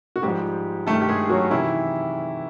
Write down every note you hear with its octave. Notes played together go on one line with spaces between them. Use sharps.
F#4
G#2 F3 G3 G4
G2 D#3 A3 A4
G4
G#3 G#4
F#3 F#4
C3 D#3 E3 E4